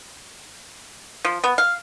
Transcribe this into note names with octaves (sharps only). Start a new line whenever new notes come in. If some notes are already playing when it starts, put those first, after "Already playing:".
F3
B3
F5